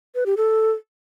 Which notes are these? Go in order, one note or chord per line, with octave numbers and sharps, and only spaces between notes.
B4
G4
A4